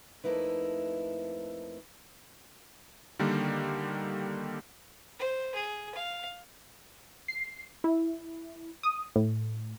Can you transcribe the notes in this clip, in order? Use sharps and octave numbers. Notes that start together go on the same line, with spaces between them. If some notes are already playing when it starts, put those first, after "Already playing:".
F2 A3 A#3 D#4 E4 B4
D3 D#3 G3 A#3
C5
G#4
F5
C7
E4
D#6
A2